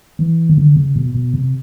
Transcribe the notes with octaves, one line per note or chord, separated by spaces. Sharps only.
E3
D#3
D3
C#3
B2
B2
C3